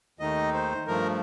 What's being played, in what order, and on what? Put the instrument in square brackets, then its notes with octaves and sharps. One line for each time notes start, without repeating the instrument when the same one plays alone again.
[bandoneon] D#2 D#3 A3 D#4 D#5
C5
G2 F3 A3 A#4